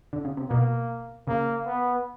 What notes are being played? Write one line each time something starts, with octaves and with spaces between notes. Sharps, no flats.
D3
C#3
C3
B2 A#3
C#3 A#3
B3